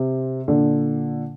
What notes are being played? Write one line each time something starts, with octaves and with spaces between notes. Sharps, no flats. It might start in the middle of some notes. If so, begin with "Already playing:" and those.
Already playing: C3
A#2 D3